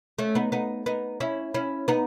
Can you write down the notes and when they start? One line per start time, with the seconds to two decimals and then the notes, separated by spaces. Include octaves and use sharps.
0.19 A3 C#4
0.35 B3 D#4
0.52 B3 D#4
0.86 B3 D#4
1.20 C#4 E4
1.54 C#4 E4
1.88 B3 D#4